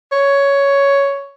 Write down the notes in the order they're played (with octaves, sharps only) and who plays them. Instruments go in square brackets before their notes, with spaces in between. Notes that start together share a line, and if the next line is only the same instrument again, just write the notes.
[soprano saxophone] C#5